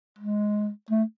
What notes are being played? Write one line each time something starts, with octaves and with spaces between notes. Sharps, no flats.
G#3
A3